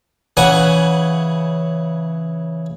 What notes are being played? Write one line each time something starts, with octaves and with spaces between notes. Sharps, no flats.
C#3 E3 F#5 G#5